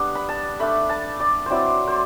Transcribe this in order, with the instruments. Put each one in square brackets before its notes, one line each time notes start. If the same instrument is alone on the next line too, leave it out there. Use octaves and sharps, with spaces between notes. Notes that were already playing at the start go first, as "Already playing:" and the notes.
Already playing: [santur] G3 B3 D4
B5
A5
A3 D4 B5
A5
D5
F#3 C4 E4 C5 D5
C5